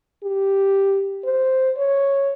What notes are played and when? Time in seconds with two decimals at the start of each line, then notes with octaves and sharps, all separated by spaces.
0.23 G4
1.25 C5
1.78 C#5